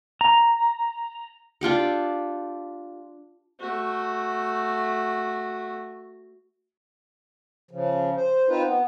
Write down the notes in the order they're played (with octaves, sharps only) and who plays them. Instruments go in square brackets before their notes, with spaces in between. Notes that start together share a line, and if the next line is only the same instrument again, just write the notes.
[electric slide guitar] A#5
[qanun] D4 F4 G4 A4
[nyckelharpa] A3 F#4
[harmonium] C#3 F3
C5
C4 D#4 F4 B4 C5
B3